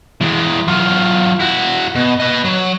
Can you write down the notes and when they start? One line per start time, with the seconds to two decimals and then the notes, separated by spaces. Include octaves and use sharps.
0.21 E3 G#3
0.68 F#3 F4
1.39 E4 F#4
1.96 B2
2.20 B4 D#5
2.44 F#3